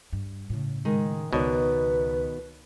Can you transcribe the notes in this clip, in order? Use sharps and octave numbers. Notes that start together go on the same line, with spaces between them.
G2
A2 C#3
D#3 G#3
C#2 B2 D#3 B4 C#5 D5